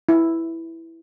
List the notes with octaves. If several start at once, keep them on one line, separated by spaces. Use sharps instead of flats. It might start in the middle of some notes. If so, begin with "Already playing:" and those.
E4